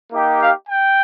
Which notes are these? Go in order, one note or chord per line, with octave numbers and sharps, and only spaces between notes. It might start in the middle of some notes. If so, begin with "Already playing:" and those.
A#3 D#4 G4
F5
G5